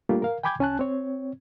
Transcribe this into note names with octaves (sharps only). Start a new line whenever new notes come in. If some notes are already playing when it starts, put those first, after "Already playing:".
G3 A3 A#3 D4 F4 G4
A#4 F5
G5 G#5 B5 D6 G6 G#6
C2 C#4 G#5 A5 F#6
C4 C#5